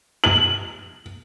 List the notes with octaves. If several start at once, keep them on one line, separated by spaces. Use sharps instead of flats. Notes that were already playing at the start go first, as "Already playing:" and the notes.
F#7